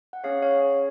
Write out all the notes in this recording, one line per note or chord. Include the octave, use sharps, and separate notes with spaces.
F#5
C#4 G#4 C#5 F5
C#5 F5